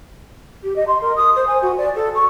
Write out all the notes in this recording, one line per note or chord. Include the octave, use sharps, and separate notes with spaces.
G4
D#5
C6
A#4
D#6
C5
G#5
F#4
D5
A4
C#6